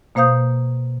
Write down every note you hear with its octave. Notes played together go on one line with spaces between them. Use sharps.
B2 A#3 C5 F5 D#6 G6